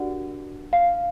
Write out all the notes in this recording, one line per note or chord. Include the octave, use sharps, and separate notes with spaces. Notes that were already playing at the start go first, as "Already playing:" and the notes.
Already playing: D4 F#4 G4 A#4 D5 F#5
F5